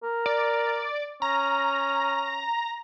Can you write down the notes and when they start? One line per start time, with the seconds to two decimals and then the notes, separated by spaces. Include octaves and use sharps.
0.03 A#4
0.26 D5
1.22 C#4 A#5